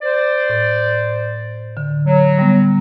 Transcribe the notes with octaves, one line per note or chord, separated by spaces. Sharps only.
C5 D5
A2
D3
F#3
G3 B3